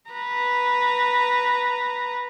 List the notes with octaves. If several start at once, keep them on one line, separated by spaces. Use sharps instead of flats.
B4 A#5